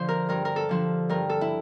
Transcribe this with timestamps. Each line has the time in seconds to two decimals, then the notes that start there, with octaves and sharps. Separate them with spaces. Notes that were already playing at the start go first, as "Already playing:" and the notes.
Already playing: D3 F3 C5
0.09 A#4
0.29 G2 A#4
0.45 A#4
0.56 A4
0.69 D3 F3
1.09 G2 A#4
1.29 A4
1.41 E4